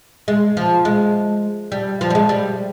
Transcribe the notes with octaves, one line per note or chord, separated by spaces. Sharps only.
G#3
F3
G#3
G3
F3
G3
G#3
G3